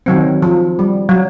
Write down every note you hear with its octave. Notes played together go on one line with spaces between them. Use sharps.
D#3 F#3 C4
F3
G3
F#3